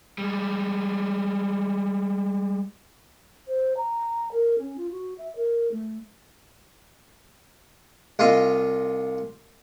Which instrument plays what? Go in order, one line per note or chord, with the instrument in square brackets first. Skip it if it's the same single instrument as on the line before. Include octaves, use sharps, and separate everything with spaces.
[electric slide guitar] G3 G#3
[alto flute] C5
A#5
A#4
C#4
F4
F#4
E5
A#4
A3
[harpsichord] C2 F4 D#5 F5